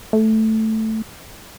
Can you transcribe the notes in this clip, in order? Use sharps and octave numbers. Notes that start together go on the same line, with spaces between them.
A3